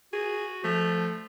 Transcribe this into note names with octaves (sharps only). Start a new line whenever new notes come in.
F#4 G#4
F3 A3